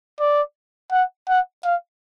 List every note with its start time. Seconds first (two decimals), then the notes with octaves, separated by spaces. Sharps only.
0.20 D5
0.92 F#5
1.28 F#5
1.64 F5